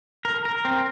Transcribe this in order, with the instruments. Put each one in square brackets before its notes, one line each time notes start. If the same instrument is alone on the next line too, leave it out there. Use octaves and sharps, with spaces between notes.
[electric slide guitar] A#4
A#4
C4